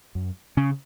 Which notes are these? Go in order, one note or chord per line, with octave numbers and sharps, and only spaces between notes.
F#2
C#3 C#4